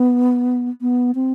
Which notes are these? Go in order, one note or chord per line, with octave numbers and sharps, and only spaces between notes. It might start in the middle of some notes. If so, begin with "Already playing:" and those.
Already playing: B3
B3
C4